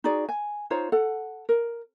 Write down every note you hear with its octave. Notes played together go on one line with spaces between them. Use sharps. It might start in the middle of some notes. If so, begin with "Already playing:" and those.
D#4 F#4 G#4 D5
G#5
D#4 F4 C5 C#5
A4 F#5
A#4